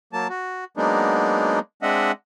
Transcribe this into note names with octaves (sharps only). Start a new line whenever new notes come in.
F#3 A#3 A5
F#4
F#3 G#3 A#3 B3 D4 D#4
G#3 C4 D4 D#5 E5 F#5